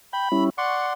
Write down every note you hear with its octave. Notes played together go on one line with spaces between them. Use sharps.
G5 B5
G3 C#4 E4
D5 F#5 C6 C#6